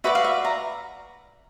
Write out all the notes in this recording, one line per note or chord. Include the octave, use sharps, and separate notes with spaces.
F#4 B4 D5 E5
F5
E5
A#5